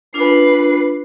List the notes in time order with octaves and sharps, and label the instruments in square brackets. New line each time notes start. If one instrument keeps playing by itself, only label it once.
[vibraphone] D4 F4 [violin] B4 C7